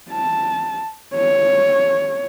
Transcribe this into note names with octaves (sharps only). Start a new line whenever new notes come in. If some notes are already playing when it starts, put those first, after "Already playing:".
A5
C#5